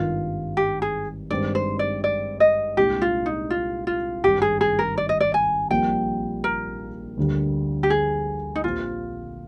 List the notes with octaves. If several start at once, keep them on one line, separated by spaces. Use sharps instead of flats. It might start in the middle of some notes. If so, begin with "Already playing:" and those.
Already playing: G#1 G2 D#3 G3 F4
G4
G#4
G2 D#3 G#3 C4 D5
C5
D5
D5
D#5
C2 A#2 G#3 D4 G4
F4
D#4
F4
F4
G#1 G2 D#3 G3 G4
G#4
G#4
A#4
D5
D#5
D5
G#5
A#1 A#2 G3 C4 F4 G5
A#4
D2 D3 G3 A#3
G4
G#4
D#4
A#1 A#2 F3 C4 F4 G4